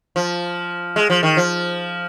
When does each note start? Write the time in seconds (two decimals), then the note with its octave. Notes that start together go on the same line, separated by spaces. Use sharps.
0.16 F3
0.96 G#3
1.10 F3
1.23 D#3
1.37 F3